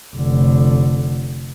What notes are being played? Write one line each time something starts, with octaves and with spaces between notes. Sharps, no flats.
F1 D3